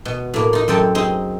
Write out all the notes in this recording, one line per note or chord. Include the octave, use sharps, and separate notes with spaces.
B2
A2 A#3
D#4 F4
F#2 C4 A4 G5
C4 D#4 G#4